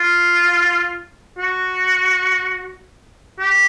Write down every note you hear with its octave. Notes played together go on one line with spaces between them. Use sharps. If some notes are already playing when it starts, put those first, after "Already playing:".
Already playing: F4
F#4
G4